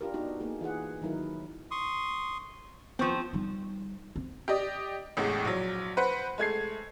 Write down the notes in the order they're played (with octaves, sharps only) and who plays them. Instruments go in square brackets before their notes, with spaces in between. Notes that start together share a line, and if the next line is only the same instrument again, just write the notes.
[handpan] D4 F4 G4 A#4
B3 D4 D#4 F#4
A#3 D#4 G#4
E3 F4 G#4 F#5
D#3 F#3 D#4 E4 A#4
[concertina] C6 C#6 D#6
[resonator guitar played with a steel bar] F3 C4 [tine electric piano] B3 C#6 G6
[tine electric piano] F4
[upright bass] G3 D#4
C4
[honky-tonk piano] G4 D5 D#5
A1 E2 A2 G#3
A#1 F#3
B4 C5 F#5
G#3 A3 G#6 C7